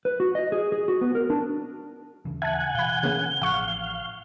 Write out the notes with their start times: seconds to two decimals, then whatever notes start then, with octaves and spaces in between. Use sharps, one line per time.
0.05 B4
0.20 F#4
0.35 D#5
0.52 G#4
0.72 G#4
0.88 F#4
1.01 B3
1.15 A#4
1.30 D4
2.25 D#1 C#3 E3
2.42 E5 F#5 G#5 A5 G#6
2.75 B2 E3 F5 B5 G7
3.03 C#3 A#3
3.42 A1 F3 F5 F#5 C#6 F#6